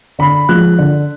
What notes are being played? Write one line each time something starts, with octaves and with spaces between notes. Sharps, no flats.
D3 B5
F3 G#3 F#6
D3